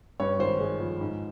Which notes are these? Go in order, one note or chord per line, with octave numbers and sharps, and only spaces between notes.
G2 C#5
G#1 C5
G#3
F3
G#2